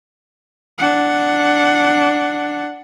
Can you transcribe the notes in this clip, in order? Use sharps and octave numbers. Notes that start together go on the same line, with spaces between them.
D4 F#5